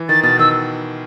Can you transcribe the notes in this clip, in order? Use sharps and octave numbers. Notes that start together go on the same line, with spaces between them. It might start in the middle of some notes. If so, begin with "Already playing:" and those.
Already playing: E3
D#3 A6
B2 A6
D#3 E6